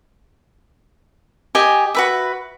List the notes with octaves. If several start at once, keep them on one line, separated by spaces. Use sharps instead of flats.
G4 D#5 G#5
F#4 B4 E5